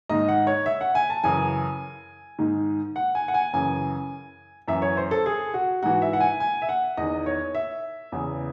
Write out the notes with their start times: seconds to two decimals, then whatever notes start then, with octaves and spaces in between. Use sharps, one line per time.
0.09 G#2 D#3 D#5
0.28 F#5
0.47 C#5
0.66 E5
0.81 F#5
0.95 G#5
1.10 A5
1.23 F#2 C#3 E3 G#5
2.39 G#2 D#3
2.96 F#5
3.15 G#5
3.28 F#5
3.34 G#5
3.53 F#2 C#3 E3 G#5
4.68 F#2 E3 E5
4.82 C#5
4.97 C5
5.11 A4
5.26 G#4
5.54 F#4
5.82 G#2 E3 F#4
6.02 E5
6.13 F#5
6.20 G#5
6.40 G#5
6.62 E5
6.69 F#5
6.97 E2 D#3 D#5
7.26 C#5
7.55 E5
8.12 E2 C#3 E3